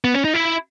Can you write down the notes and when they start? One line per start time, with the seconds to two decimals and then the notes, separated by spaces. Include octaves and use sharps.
0.04 B3
0.14 C#4
0.24 D#4
0.34 E4